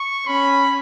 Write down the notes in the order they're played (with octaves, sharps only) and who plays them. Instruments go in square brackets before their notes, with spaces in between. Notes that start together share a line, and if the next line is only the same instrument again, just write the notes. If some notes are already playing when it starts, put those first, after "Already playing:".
Already playing: [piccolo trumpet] C#6
[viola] C#4 [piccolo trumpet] B5